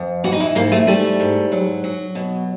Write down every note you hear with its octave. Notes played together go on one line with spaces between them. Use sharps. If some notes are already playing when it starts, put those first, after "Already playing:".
Already playing: F2
E3 F#4
D#4
E4
G#2 A#3
A3
G3 A3
G#2
F#3
F#3
B2